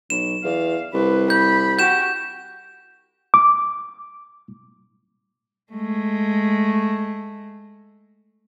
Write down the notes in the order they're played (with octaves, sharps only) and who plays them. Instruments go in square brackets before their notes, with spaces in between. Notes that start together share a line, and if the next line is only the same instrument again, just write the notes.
[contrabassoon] B1 [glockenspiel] E7
[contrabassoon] E2 [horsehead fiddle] F5
[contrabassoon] C2 [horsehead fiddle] B4
[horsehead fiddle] B5 [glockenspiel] G6
[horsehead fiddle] F#4 G4 [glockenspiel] G6 E7
[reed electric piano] D6
[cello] G#3 A3